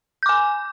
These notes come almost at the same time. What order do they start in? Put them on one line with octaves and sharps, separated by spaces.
G6 D6 G#5